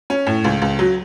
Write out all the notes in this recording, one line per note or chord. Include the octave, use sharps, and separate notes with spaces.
C#4
A2
C#2
C#2
F#3